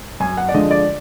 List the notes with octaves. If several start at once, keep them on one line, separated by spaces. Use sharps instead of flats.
F#2 G#5
F#5
D5
D3 F3 G#3 D4 D#5
D5